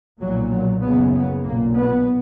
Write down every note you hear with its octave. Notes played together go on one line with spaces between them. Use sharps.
B1 A#2 F#3
F#3
F#1 F#2 C#3 B3
B3
B1 A#2 A#3
B3